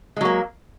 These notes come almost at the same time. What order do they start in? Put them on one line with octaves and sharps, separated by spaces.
G#3 F#3 A#3